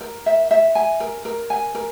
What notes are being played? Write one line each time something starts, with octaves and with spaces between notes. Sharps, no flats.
A#4
E5
E5
G#5
A#4
A#4
G#5
A#4